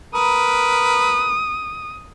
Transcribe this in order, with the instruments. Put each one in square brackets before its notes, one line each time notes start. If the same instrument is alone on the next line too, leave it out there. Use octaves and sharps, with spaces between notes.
[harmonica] A#4 B4 [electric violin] D#6